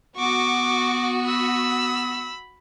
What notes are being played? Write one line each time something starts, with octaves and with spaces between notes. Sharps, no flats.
B3 F#4 C#6 D6
B5 E6